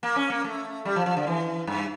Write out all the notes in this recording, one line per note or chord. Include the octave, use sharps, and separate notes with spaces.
A#3
C#4
A#3
A3
G3
F3
F3
D3
E3
G2